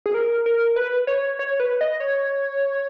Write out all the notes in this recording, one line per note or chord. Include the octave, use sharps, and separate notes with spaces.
G#4
A#4
A#4
B4
C#5
C#5
B4
D#5
C#5